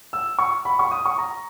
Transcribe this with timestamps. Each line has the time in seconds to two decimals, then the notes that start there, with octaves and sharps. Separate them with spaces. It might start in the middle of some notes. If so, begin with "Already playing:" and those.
0.13 E6
0.39 C#6
0.65 B5
0.79 C#6
0.91 D#6
1.06 C#6
1.18 A#5